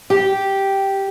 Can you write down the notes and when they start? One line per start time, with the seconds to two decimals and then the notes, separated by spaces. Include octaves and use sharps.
0.10 G4